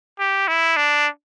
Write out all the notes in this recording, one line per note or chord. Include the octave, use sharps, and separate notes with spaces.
G4
E4
D4